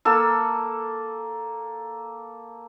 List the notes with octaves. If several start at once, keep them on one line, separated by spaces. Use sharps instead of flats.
A#3 A4 E6